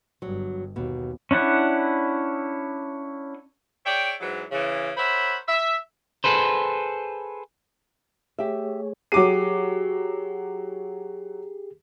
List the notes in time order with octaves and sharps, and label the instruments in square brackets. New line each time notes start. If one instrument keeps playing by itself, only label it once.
[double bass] G1 G2 [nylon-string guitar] F#3
[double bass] D#2 [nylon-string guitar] B2
[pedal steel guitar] C#4 D4 E4 F#5
[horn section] G#4 C#5 D5 E5 G5
G#2 E3 F#3
C#3 E3
A#4 C5 C#5 E5 F#5 B5
E5
[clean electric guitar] G#4 A4 B4 C5
[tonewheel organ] A3 G#4 C#5 [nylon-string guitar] G4 E5
[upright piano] F#3 D6 D#7 [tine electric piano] G4 G#4 C7